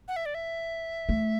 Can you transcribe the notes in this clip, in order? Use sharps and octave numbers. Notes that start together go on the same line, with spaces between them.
F#5
E5
D5
E5
A3